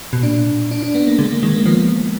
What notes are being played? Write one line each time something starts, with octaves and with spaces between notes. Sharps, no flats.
B2
A#2 D4
D4
D4
B3
A#3
D3 G#3
A#3
D#3 G#3
A#3
F3 B3